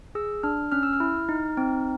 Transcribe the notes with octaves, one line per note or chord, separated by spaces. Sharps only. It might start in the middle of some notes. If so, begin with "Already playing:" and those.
G#4 E6
D4 F6
C#4 F6
E6
F6
E4
D#4
C4